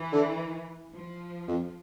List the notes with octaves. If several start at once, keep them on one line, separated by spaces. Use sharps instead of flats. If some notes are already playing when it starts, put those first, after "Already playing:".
Already playing: E3
D3
F3
F2